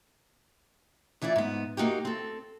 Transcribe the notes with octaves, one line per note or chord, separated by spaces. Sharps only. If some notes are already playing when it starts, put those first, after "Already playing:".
D2 E3 E4 F4 D5
G#2 B3
A#3 D#4 F#4 G4
C4 A4